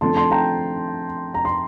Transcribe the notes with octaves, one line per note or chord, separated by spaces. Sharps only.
D3 F3 A3 C4 A5 C6
A5 C6
G5 A#5
A#5
C6